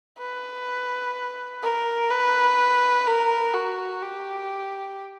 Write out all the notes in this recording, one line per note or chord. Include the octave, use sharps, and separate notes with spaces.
B4
A#4
B4
A#4
F#4
G4